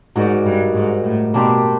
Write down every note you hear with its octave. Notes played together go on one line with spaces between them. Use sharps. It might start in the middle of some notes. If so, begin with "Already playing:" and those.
G#2 D#4 F#4 A#4 D5
G2
G#2
A2
B2 A#3 D4 G4 C5